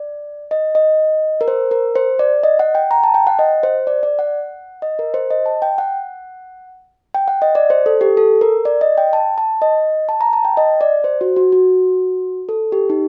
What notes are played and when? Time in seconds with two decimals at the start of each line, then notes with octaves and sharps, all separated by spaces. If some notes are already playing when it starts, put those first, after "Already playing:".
Already playing: D5
0.51 D#5
0.75 D#5
1.41 A#4
1.48 C5
1.71 A#4
1.95 C5
2.19 D5
2.43 D#5
2.59 F#5
2.75 G5
2.91 A#5
3.04 A5
3.14 G5
3.27 F#5
3.39 D#5
3.63 C5
3.87 D5
4.03 D5
4.19 F#5
4.82 D#5
4.99 A#4
5.14 C5
5.31 D#5
5.46 A5
5.62 G5
5.78 F#5
7.15 G5
7.28 F#5
7.42 D#5
7.55 D5
7.70 C5
7.86 A4
8.01 G4
8.17 A4
8.41 A#4
8.65 D5
8.81 D#5
8.98 G5
9.13 A5
9.38 A5
9.62 D#5
10.09 A5
10.21 A#5
10.33 A5
10.45 G5
10.57 D#5
10.81 D5
11.04 C5
11.21 F#4
11.36 F#4
11.52 F#4
12.49 A4
12.72 G4
12.90 D#4